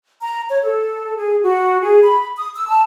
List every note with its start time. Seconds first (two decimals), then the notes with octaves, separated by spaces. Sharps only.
0.21 A#5
0.49 C#5
0.62 A4
1.17 G#4
1.43 F#4
1.81 G#4
2.05 B5
2.35 D#6
2.56 E6
2.68 A5